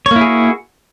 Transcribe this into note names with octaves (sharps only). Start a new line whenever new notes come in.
A#3 E4 F#4 G#4 C#5